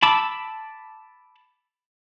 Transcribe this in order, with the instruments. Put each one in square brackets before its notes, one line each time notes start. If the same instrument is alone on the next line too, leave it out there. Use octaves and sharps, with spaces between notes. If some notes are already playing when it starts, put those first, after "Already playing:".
[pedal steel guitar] A5 B5 D6 E6